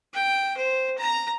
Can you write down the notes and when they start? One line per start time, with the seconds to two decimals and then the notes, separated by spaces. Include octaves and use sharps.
0.14 G5
0.57 C5
0.98 A#5